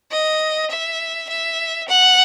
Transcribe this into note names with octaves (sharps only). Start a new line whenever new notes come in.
D#5
E5
E5
F#5